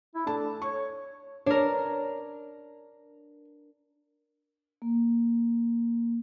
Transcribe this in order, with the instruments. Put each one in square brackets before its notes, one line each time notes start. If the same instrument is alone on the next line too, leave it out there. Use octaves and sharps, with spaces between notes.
[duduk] E4
[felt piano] A3 A5 [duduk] D4
[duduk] C#5 [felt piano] C#6
[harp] D4 A#4 [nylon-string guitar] C#5
[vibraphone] A#3